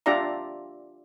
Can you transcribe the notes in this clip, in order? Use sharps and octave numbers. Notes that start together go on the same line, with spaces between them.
D4 F4 G4 D5 E5 A#5